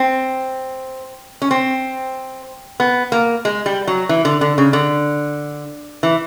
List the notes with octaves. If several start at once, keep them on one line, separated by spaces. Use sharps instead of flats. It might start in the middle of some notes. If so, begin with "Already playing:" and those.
Already playing: C4
C#4
C4
B3
A#3
G#3
G3
F#3
E3
D3
D3
C#3
D3
E3